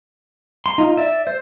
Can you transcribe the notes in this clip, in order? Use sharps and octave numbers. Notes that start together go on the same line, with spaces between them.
C6
D#4 F4
D5 E5
C5